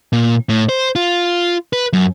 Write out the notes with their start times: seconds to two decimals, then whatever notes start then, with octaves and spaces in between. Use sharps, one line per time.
0.13 A#2
0.49 A2
0.69 C5
0.96 F4
1.73 B4
1.93 F#2